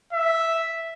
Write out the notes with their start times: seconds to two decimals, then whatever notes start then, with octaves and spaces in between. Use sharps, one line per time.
0.13 E5